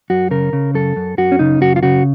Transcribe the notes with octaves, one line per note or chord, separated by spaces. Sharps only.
F#2 F#4
C#3 A#4
C#3
F#2 A4
F#2
F#2 F#4
C#4
C#3 D#4
F#2 F#4
F4
C#3 F#4